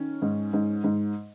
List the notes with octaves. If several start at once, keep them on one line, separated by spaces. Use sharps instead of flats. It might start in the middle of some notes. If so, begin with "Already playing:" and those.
Already playing: D#3 C#4
G#2
G#2
G#2